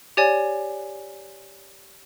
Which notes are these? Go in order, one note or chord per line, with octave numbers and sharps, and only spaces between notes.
G4 C#5 D5 G#5